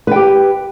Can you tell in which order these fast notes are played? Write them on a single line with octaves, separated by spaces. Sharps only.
B4 G5 G4